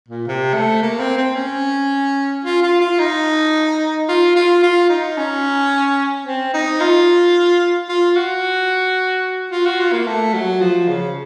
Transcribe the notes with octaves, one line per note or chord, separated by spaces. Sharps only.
A#2
C3
A3
A#3
C4
C4
C#4
F4
F4
F4
D#4
F4
F4
F4
D#4
C#4
C4
D#4
F4
F4
F#4
F4
F#4
F4
A#3
A3
F#3
F3
C#3